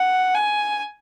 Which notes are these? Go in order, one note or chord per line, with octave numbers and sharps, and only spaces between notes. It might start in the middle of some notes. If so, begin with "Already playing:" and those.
Already playing: F#5
G#5